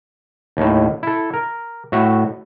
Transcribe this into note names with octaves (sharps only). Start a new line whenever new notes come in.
D#2 A2
E4 A4
A#4
A2 F#4 E5